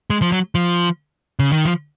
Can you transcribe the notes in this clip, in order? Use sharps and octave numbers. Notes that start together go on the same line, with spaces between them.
G#3
F3
F#3
F3
C#3
D#3
F3